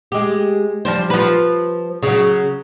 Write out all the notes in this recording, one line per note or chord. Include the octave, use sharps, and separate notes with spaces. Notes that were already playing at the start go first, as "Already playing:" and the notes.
G#3 G4
F3 G3 C5
F3 B4
C#3 F#3